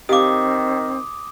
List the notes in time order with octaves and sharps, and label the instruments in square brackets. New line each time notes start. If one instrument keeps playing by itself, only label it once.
[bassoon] D#3 [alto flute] C4 [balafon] G4 F5 [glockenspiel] D6 D#6